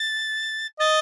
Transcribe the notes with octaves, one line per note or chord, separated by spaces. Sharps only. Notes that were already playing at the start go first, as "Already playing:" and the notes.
Already playing: A6
D#5 A6